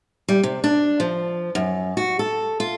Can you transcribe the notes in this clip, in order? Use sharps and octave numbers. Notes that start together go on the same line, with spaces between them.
G3
C3
D4
F3
F#2
F#4
A4
F4